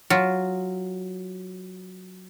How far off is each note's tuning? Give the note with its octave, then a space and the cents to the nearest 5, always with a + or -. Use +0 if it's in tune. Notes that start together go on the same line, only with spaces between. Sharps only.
F#3 +0 F4 +0